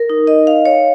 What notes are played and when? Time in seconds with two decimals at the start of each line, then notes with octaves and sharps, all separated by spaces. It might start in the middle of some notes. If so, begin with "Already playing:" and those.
Already playing: A#4
0.10 D#4
0.27 D#5
0.47 F5
0.66 C#5